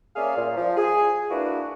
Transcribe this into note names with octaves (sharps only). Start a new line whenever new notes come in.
A#3 C#4 G#4 D5 E5 F5
A#2
F3
G#4
A#3 D4 E4 F#4 B4